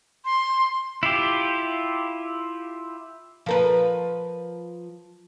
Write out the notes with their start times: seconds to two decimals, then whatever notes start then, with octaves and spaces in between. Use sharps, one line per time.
0.25 C6
1.03 E4 F4 G4
3.46 F3 A#4 B4